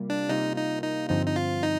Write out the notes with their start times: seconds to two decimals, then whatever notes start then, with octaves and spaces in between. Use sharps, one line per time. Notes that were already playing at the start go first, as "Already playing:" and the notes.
Already playing: C3 G3 A#3 F4
0.10 D4
0.29 C3 G3 A#3 D#4 F4
0.56 D#4
0.83 D#4
1.10 G2 D3 F3 C4 D#4
1.26 D#4
1.36 F4
1.63 D#4